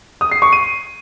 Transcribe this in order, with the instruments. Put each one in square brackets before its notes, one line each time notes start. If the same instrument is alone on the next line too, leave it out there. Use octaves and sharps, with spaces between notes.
[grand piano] D#6
C7
C#6
D#7